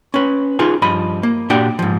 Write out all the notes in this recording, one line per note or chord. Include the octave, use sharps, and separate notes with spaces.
C#4 B4
D#4 F4 G#4 B4 G#5
G2 F3 D#5 B5
A#3
A#2 D4 F#4 G4 G5
G#2 F3